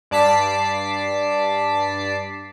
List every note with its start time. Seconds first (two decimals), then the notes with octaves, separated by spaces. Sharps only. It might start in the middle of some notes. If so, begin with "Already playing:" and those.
0.11 G2 D5 A5 D6 B6 C7